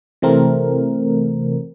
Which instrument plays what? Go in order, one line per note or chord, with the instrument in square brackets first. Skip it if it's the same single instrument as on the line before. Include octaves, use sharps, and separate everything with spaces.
[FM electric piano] C3 E3 A3 C4 A#4